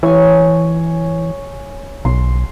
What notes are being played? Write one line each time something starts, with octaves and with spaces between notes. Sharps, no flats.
E3 C#5 G#5
B1 C6